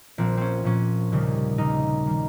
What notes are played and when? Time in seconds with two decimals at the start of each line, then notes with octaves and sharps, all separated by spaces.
0.18 A#1 A#2 F3 C4
0.37 C4 C#4
0.63 A#1 A#2 F3 C#4
1.11 F1 D#2 C#3 G3
1.58 F1 D#2 C#3 G3 D#4
2.07 D#3 G3